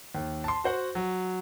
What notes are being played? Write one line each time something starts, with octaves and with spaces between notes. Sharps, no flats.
D#2
A5 C6
F#4 C5 F#5
F#3